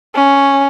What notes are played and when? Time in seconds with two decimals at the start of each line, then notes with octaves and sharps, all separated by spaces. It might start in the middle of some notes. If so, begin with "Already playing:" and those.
0.15 C#4